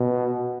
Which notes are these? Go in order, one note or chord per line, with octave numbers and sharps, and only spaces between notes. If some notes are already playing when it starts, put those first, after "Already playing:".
Already playing: B2